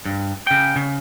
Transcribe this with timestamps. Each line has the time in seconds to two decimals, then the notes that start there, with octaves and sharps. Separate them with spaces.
0.05 G2
0.47 C#3 G5
0.76 C#3